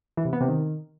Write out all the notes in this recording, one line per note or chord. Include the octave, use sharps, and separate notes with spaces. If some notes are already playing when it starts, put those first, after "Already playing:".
E3
C3
B3
C3
D#3